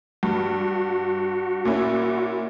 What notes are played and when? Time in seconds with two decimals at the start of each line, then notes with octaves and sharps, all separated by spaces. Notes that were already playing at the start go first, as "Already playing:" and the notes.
0.23 G2 F#4
1.65 A#2 C#4 E4